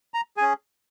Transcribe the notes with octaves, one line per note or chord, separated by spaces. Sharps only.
A#5
C#4 G#4 G#5